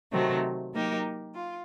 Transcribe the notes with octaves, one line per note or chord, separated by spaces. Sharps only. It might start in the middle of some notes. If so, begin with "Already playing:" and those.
C3 D#3 F#3 A3 C4
F#3 A#3 D#4 G4 A#4
F4